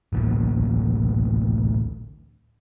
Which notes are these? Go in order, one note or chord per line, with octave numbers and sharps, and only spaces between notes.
A1 D2 A#2